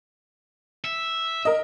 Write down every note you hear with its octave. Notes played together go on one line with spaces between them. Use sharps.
E5
A#4 D#5